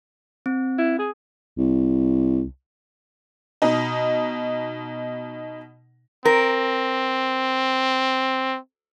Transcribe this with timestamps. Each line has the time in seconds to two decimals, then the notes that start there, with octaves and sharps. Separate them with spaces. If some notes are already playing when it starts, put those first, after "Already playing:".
0.46 C4
0.78 E4
0.99 G#4
1.57 C2
3.62 B2 D#4
6.25 C4 A#4